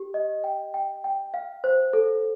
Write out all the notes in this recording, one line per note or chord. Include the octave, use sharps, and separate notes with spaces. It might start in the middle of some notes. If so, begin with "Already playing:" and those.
Already playing: G4
D#5
G5
G5
G5
F5
C5
A4